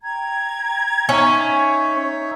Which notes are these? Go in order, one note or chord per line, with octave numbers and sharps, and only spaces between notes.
G5 A#5 G#6
C#4 D#4 C#5 E5